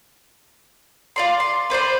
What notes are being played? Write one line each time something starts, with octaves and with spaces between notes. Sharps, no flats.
F4 D5 C6
C6
B4 C5 D5 C6